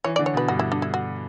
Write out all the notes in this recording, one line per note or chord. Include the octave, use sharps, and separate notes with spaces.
E3 C#5
D3 D5
C#5
B2
B4
G2 F#4
E4
D4
E4
F#4